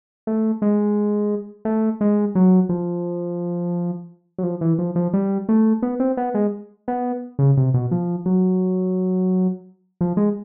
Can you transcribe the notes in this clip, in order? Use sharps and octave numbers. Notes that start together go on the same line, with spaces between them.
A3
G#3
A3
G#3
F#3
F3
F#3
F3
E3
F3
F3
G3
A3
B3
C4
B3
G#3
B3
C#3
C3
B2
F3
F#3
F3
G#3